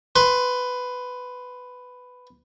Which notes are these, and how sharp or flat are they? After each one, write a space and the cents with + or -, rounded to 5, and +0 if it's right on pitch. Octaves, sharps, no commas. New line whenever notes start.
B4 +10 C6 +0